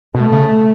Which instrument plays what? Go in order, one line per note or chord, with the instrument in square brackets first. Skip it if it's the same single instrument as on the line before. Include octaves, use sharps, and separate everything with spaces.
[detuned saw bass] B2 [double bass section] A3
[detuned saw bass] C#3